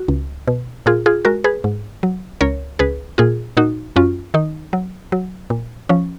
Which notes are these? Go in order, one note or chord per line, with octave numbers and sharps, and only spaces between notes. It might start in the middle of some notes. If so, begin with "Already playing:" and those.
Already playing: F#4
C#2
B2
A#2 F4 G#4
F4 G#4
G#3 F#4 A#4
G#4 B4
G#2
F#3
C#2 A#4 C#5
C#2 G#4 B4
A#2 F4 G#4
A#2 D#4 F#4
F#2 C#4 F4
D#3 D#4
F#3
F#3
A#2
F3 C#4